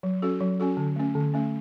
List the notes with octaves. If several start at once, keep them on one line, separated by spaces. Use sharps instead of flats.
F#3
C#4 F#4 A4
F#3
C#4 F#4 A4
D3
A3 C#4
D3
A3 C#4